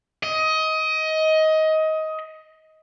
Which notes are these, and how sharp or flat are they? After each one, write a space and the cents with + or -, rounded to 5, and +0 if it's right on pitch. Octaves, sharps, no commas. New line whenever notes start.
D#5 +20